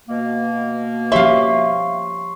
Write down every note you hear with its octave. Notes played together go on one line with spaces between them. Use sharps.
B2 A#3
F3 G4 C#5 E5 F5 C6 C#6 C7